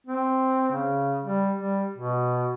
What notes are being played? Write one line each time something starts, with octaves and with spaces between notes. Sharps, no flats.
C4
C#3
G3
G3
B2